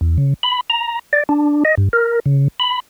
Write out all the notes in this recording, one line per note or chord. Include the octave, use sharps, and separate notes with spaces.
E2
C#3
B5
A#5
D5
D4
D#5
G2
A#4
C#3
B5